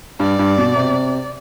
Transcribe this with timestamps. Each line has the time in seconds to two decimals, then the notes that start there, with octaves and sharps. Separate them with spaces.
0.20 G2 D5
0.39 G2
0.58 B2
0.76 C3